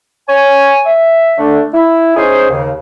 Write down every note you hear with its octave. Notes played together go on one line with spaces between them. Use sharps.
C#5 G#5
E5
D3 A3 D4
E4
C#4 D#4 G#4 C5
D#2 C#3